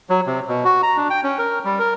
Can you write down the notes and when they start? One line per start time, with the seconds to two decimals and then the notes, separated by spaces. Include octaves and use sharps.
0.10 F#3
0.26 C3
0.48 B2
0.65 F#4
0.83 A#5
0.97 D4
1.10 G5
1.23 C#4
1.38 A#4
1.65 G3
1.79 A#4